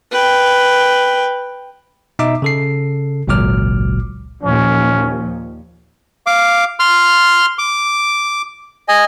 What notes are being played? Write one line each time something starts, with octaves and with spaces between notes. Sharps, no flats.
B4 G5
B2 D#4 E5 D6 E6
C#3 A4 C7
G#1 C#2 A#2 F#3 D6 F6
D#2 A#2 F3 C#4
F5 D6
C6 F6
D6
D#5 G#5